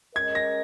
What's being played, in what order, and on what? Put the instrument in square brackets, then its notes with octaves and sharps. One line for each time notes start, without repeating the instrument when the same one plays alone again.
[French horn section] G#3 C#4 A#4 D#5 [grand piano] G#6
[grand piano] A#6